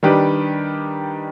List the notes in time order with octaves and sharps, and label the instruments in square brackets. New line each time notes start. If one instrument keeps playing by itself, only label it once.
[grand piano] D#3 G3 D4 G4 B4